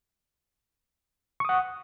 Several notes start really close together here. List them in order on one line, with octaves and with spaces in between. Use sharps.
C#6 D#6 F#5